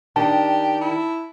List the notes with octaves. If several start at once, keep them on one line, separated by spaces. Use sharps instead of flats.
D#3 D4 G4 A5
E4